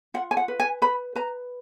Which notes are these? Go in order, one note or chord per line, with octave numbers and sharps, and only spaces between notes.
F4 F#5
G#5
F#5
B4
G#5
B4 B5
B4 A#5